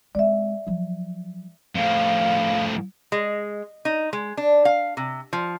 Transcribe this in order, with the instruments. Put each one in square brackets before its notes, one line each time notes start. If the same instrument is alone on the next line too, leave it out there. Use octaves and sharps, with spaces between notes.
[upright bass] G#3 C4 [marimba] D5 E5
[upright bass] F3 F#3
[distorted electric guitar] A2 F3 [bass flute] F5
[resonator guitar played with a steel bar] G#3
D#4
G#3
D4
F5
C3
F3